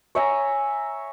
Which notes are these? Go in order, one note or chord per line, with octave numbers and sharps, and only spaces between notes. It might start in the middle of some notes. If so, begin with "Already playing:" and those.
C#5 E5 G#5 A#5